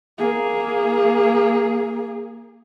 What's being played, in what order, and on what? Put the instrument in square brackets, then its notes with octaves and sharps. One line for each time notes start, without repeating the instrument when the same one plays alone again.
[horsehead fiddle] A#3 G#4